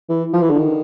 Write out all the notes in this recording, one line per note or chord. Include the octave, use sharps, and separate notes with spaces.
E3
F3
E3
D3
D#3